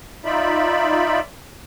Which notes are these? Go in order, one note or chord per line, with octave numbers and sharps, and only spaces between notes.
D#4 F4 D5 E5 B5